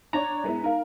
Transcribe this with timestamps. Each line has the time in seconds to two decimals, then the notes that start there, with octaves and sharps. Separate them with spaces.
0.13 D4 C#5 D5 A#5
0.44 G#3 B3 E4
0.64 D#4 A#4 F5